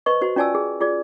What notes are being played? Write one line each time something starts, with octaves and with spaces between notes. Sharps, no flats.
B4 C5 D#5 C#6
F#4 C5
C#4 F4 D5 G#5 A5 E6
G#4
F4 G#4 D5